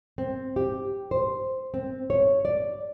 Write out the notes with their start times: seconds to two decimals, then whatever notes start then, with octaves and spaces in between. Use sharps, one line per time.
0.18 C4
0.56 G4
1.11 C5
1.74 C4
2.10 C#5
2.45 D5